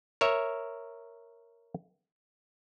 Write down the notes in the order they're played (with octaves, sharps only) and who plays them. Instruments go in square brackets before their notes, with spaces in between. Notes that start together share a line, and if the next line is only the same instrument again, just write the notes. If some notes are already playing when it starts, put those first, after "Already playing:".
[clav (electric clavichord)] A#4 C#5 E5